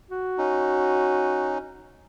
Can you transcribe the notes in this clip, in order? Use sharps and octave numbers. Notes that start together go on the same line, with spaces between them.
F#4
C#4 D#4